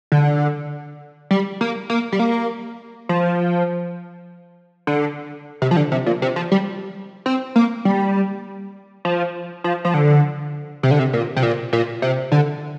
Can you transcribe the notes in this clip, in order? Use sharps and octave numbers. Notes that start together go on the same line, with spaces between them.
D3
G3
A#3
A#3
G3
A#3
F3
D3
C3
F3
D3
C3
A#2
C3
F3
G3
C4
A#3
G3
F3
F3
F3
D3
C3
D3
C3
A#2
C3
A#2
A#2
C3
D3